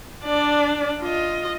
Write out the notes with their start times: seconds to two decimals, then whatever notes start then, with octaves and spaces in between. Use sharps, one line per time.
0.23 D4 D5
1.01 F4 D#5